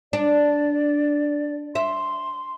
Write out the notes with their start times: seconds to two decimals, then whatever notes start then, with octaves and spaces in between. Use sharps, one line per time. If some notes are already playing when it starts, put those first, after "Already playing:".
0.13 D4 D5
1.75 E5 C6